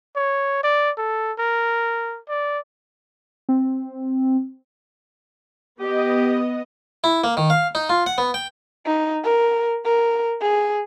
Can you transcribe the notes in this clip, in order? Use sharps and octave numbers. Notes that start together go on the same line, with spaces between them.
C#5
D5
A4
A#4
D5
C4
B3 G4 D#5
E4
A#3
D#3
F5
D#4
F4
F#5
B3
G5
D#4
A#4
A#4
G#4